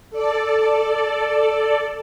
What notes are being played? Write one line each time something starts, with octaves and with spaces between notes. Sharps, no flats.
A4 D5